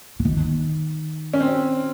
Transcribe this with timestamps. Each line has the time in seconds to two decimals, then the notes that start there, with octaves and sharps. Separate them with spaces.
0.19 E3
0.25 D#3
1.34 C#4
1.40 C4